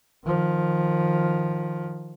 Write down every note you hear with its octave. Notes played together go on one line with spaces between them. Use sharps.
D#3 F3